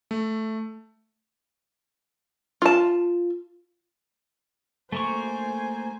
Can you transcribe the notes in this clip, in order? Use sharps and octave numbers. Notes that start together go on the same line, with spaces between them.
A3
F4 A5
A3 A#3 C5 G#5 C#6